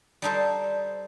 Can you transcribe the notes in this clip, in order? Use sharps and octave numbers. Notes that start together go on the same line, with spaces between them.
G3 D#4 A4 C5